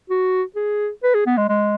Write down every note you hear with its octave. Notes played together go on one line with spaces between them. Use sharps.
F#4
G#4
B4
G#4
B3
G#3
G#3